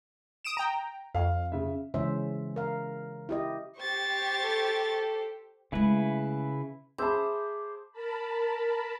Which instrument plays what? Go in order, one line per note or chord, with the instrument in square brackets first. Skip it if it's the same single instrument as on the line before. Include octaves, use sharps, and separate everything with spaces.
[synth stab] D#6 D7 E7
G5 A#5
[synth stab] F2 [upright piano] F5
[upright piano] C#3 E5
[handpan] C#3 E3 G#3 C#4 C5 E5
A#4 F5
E4 G4 D#5
[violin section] G4 C5 [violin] C#6 A6
[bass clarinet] A4
[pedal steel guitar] C#3 E4 B4 [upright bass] G#3 A3
[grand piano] G#4 E5 A5 [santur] C5 [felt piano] B5 E6 [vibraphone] D6
[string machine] A#4 A5 B5